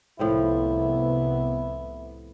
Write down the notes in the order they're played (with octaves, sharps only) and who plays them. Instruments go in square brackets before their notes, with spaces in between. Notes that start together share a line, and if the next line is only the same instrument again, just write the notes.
[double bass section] C2 C3 B3 [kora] A2 F3 C4 [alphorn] E4